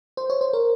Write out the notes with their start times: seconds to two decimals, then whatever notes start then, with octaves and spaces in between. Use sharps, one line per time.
0.17 C5
0.30 C#5
0.41 C5
0.53 A#4